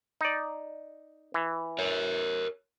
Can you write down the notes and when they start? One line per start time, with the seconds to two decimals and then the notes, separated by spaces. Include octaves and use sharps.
0.21 D#4 D5
1.34 E3
1.79 A#4 C#5